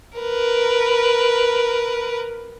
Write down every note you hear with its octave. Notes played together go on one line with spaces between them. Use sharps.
A#4 B4